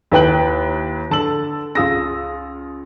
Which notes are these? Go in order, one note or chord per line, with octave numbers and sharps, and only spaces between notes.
D#2 E4 B4 G5 F#6 F#7
D3 A5 E6 F#7
C#2 F4 F5 D#6 E6 A#6